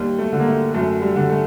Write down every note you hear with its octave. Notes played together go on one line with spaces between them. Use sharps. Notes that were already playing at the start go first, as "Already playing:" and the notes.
Already playing: D#2 G3
A3
D3
A#3
A3
F#2 A3
G3
D3
A3